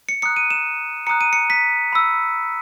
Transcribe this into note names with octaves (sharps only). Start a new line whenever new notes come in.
C#7
A#5 D#6 F#6 C#7
D#7
E7
A#5 D#6 F#6 C#7
D#7
C#7
B6
B5 E6